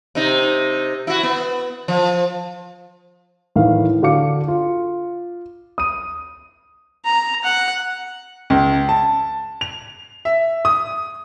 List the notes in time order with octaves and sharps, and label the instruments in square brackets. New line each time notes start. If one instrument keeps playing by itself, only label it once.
[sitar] C3 D#4
E4 F#4
B3
F3
[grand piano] A2 D#3 E3 F5
D3 F#4 F5 D6 C#7
F4
D#6 D#7
[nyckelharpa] A#5
F#5
[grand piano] C#2
A5
F7
E5
D#6